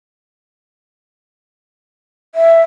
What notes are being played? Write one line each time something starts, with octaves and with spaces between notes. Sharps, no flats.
E5